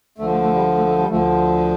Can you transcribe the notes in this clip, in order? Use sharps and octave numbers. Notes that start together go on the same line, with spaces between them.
D2 D3 F3 A3
A3
A3
G3
A3
A3
G3
D2 D3 F3 A3